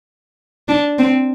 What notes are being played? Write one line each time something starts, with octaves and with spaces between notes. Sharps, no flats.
D4
C4